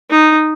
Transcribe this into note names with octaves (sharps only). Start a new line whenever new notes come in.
D#4